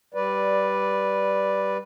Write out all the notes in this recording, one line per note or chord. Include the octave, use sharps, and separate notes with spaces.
G3 B4 D5